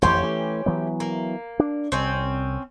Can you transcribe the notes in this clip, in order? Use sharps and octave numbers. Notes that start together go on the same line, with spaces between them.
A1 F2 E3 C#4 G4 C5
E3 A3
E3 F#3 B3
A#3
D4
C2 C4 C#4